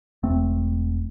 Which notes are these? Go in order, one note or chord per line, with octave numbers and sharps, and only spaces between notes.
E1 A3 C4